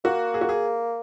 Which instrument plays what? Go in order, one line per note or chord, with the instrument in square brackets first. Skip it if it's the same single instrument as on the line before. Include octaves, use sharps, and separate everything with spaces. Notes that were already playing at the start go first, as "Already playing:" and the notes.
[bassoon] A#3 [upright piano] F#4
[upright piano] G#4
F#4
G#4